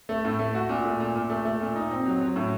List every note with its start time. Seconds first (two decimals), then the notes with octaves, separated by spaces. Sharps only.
0.09 A3
0.25 A2
0.39 A3
0.55 F#4
0.69 A#2
0.85 A3
1.00 A#2
1.15 A#2
1.30 A3
1.45 A3
1.60 A#2
1.76 D#4
1.91 C4
2.06 F#3
2.21 F#3
2.36 A2